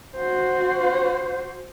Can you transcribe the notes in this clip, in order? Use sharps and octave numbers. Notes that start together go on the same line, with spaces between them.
F#4 C5